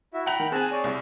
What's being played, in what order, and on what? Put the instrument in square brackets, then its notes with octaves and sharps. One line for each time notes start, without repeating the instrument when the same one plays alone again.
[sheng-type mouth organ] E4 F#4 E5
[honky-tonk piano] F#5 F7 [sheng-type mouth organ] G5 A#5 B5
[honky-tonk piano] D#3
[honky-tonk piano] C4 G#5 [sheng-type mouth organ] G#4 A5 F#6
[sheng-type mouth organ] G#4 C#5 D5
[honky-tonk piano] C2